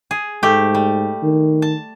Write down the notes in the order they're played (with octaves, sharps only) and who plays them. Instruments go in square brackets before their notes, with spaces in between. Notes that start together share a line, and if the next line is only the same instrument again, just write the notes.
[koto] G#4
[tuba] G#2 [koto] A3 G4
[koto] G3
[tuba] D#3
[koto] A5